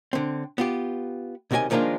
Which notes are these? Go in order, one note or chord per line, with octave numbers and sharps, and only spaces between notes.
D3 C4
B3 F4 G4
B1 C3 D#3 F#4 D#5 G#5
D#3 F3 G#3 A#3 D4 F4